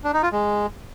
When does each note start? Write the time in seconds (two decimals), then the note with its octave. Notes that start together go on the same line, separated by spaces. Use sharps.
0.04 D4
0.13 D#4
0.23 F4
0.32 G#3